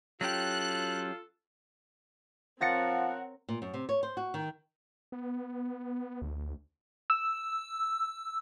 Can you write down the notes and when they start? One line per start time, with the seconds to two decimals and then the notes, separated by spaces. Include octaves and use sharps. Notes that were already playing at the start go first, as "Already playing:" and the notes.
0.21 F#3 C#4 F4 G4 A4 F#6
2.61 F3 C4 A#4 C#5 F#5 A6 A#6 C#7
3.49 A#2
3.62 F#2
3.74 C3
3.89 C#5
4.03 C5
4.17 F#4
4.34 D#3
5.12 B3
6.22 D2
7.10 E6